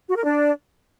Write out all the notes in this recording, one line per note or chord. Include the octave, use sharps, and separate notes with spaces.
F#4
A#4
D4